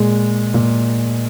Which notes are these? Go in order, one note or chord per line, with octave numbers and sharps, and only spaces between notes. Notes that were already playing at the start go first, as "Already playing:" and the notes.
Already playing: A#2 G#3
A#2